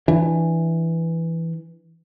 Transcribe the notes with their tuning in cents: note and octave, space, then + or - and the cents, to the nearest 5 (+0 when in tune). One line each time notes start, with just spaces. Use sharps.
E3 +0 D4 +10